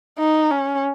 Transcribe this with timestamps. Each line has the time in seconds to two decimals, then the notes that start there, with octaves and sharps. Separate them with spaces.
0.18 D#4
0.50 C#4